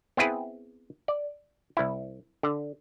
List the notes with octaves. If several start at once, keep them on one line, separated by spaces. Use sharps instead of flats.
B3 C4 E4 G#4 B4
D5
C2 E4
D3